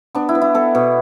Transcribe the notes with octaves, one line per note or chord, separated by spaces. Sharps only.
B3 D4
E4
B3
E4
B3 A4
B2